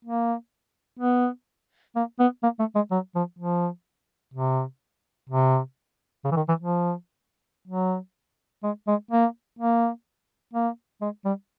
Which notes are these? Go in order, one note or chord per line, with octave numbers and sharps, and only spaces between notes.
A#3
B3
A#3
B3
A#3
A3
G#3
F#3
F3
F3
C3
C3
C#3
E3
D#3
E3
F3
F#3
G#3
G#3
A#3
A#3
A#3
G#3
G3